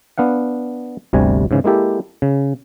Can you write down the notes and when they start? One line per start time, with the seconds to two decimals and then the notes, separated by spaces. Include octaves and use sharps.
0.18 B3 D4 F5 F#5
1.13 G1 D2 C3 G3 G#5
1.51 G#2 C#3 E3
1.64 G#3 A#3 E4 G4 A4
2.22 C#3